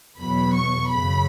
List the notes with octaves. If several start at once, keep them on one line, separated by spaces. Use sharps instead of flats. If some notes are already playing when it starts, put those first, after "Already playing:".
E2 B2 F#3 B5
C#6
F#2 C#3 F#3 B5